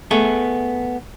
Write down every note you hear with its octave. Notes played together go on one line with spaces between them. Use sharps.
A3 B3 G#4